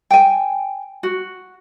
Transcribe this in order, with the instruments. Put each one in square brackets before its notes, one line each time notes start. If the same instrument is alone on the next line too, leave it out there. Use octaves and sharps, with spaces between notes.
[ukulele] G5 G#5
F#4